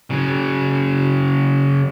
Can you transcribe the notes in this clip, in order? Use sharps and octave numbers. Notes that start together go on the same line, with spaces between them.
C#3 F#3